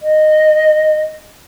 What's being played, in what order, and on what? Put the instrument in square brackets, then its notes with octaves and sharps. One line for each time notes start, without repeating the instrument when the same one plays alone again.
[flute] D#5